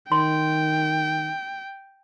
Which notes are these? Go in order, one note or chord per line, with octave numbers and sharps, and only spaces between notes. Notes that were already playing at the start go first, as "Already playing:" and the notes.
D#3 G5 C6